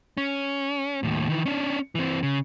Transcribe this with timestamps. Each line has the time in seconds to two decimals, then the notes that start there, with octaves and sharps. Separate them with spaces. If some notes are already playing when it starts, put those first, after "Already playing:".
0.17 C#4
1.03 D#2 A2
1.29 D#3 E3
1.46 C#4 D4
1.95 E3 C4
2.23 C#3